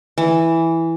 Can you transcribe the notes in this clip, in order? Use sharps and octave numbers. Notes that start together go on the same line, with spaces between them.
E3